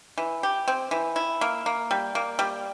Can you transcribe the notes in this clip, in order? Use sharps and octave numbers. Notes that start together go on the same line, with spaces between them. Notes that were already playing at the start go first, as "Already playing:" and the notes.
E3
G4
C4
E3
E4
A#3
A#3
G3
A#3
G3